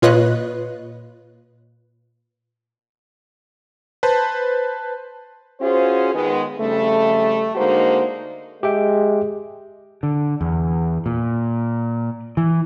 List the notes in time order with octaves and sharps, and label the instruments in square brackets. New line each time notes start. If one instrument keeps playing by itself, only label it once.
[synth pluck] A#2 F4 B4 C#5 D#5 F#6
[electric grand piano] B4 C5 A5
[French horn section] C#4 F4 F#4 G#4 C5
D#3 G#3 B3
F2 C#3 G3 A3
D3 G#3 A#3 D#4 F#4 C5
[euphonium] G#3 [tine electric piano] G4 E5 G5
[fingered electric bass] D3
E2
A#2
E3